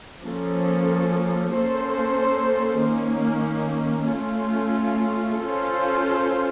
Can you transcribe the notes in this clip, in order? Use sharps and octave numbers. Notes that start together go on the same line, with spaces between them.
F3 A#3 C#4 A4
A#3 C#4 A4 C5
D#3 A#3 C#4
A3 C#4 F4
C#4 F4 A4 C5